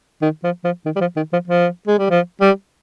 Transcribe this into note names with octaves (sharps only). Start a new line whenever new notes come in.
D#3
F3
F3
D#3
G3
F3
D#3
F3
F3
G#3
G3
F3
G3